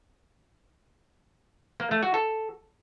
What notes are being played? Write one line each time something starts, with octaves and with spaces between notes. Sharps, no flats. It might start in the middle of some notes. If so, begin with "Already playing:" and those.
A#3
A3
F#4
A4